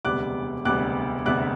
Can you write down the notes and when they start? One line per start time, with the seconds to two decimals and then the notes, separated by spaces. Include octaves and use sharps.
0.05 E1 D2 C3 G3 B3 D6 F#6
0.65 E1 D2 C3 G3 B3 D6 F#6
1.26 E1 D2 C3 G3 B3 D6 F#6